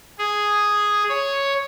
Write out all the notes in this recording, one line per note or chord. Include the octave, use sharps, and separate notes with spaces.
G#4
C#5